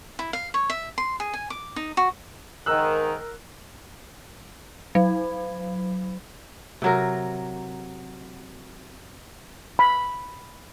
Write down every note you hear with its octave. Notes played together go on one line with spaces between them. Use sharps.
E4
F5
C#5
E5
C6
G#4
G#5
D6
D#4
F#4
G#2 D#3 A#4 E6 F#6
F#3
C3 F#3 A#4
B5